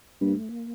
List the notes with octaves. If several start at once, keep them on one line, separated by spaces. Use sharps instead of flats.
G2 A#3
A3
A#3